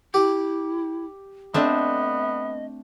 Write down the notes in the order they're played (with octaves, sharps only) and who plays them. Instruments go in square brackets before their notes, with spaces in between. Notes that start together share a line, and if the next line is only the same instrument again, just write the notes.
[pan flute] E4 [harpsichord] G4
[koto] A3 C4 D4 [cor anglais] B3 [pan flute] D#5